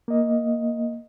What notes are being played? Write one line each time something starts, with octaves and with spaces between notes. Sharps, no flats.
A#3 D#5